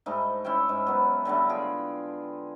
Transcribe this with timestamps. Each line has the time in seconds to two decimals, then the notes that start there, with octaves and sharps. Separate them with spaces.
0.06 G#2 G3 A3 D#4
0.45 C#4 E4 E5 G5
0.69 G#2
0.87 F#3 B3
1.25 D3 F#3 G3 A3
1.49 F4 G#4 G5